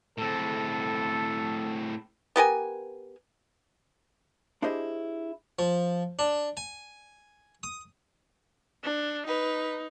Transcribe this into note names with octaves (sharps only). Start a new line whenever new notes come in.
A2 C4 A4
B3 G4 A#4 G#5
D4 E4 G4 G#4 C5 D#5
F3
D4
G#5
D#6
D4
D#4 B4